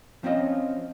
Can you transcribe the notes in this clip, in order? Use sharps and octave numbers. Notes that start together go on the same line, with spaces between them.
F3 C4 C#4 F4 D#5